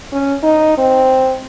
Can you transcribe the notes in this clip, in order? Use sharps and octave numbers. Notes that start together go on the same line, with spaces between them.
C#4
D#4
C4